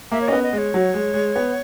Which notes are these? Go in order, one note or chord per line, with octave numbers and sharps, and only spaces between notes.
A#3 E5
C#5
B3 C#4 D#5
D#5
G#3
C#5
F#3
G#3
G#3
B3